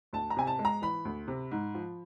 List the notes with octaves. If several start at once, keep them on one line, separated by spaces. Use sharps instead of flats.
D2 A5
A#5
C3 G#5
A5
G#3
A#5
E3 B5
D2
C3
G#2
F3